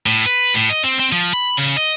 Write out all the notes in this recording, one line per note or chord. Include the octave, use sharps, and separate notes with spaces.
A2
B4
A2
D#5
C4
C4
F3
B5
C#3
D#5